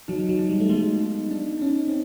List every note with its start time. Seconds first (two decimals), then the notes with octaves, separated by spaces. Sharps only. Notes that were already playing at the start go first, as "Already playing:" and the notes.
0.08 F#3 D#4
0.29 F#3
0.39 D#4
0.49 G3
0.60 A3
0.69 G#3 B3
1.00 D#4
1.31 D4 D#4
1.62 C#4 D#4
1.87 C4